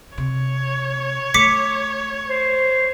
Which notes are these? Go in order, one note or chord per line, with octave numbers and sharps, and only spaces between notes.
C3 C#5
A3 D6 B6 C#7
C5